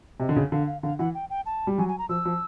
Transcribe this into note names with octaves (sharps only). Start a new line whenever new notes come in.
C3 D#5
D3
C#3
D3 F5
F5
D3 F5
E3 F#5
G5
G5
A5
G3
F#3 G#5
G#5
A#5
F3 E6
F3